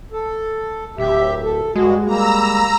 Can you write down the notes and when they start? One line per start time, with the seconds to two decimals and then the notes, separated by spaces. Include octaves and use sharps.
0.12 A4
0.98 D1 G4 E5
1.44 A4
1.75 G2 G#3 F#4
2.06 G3 A#3 A#5 E6